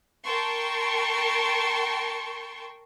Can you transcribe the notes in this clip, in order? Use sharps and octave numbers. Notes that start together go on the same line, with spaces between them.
A#4 G5 A5 C6 C#6